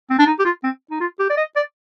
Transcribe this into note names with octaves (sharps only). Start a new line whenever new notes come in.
C4
D4
D#4
G4
F4
C4
D#4
F4
G4
D5
D#5
D5